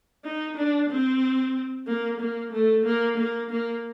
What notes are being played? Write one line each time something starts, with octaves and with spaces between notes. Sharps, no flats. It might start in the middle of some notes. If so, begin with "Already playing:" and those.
D#4
D4
C4
A#3
A#3
A3
A#3
A#3
A#3